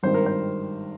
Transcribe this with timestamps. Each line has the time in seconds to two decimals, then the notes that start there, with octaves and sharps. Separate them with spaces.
0.03 G#1 G2 D#3 G3 C5
0.14 A#4
0.26 C5